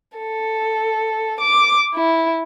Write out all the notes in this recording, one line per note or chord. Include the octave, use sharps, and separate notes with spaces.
A4
D6
E4